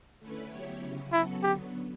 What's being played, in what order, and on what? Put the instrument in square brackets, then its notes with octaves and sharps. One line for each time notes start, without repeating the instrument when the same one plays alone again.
[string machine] D3 A3 C#4 E4 B4
F#3 B3 E4 G4 C#5
C#3 F#3 C#4
[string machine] F#3 B3 F#4 A4 [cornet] E4
[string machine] D3 F#3 B3 [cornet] G4